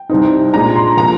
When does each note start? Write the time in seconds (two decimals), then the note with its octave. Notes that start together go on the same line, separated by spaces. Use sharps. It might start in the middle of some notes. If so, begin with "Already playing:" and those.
Already playing: G5
0.10 C2 C3 G3 C4 D#4
0.54 A#2 G#3 D4 A#5
0.76 C6
0.97 C3 F3 A#3 A#5